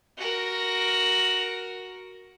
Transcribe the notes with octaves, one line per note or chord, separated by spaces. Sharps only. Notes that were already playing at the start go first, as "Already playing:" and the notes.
F#4 A#4